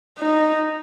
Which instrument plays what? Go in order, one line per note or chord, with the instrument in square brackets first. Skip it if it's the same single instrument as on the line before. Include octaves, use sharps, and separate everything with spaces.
[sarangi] D#4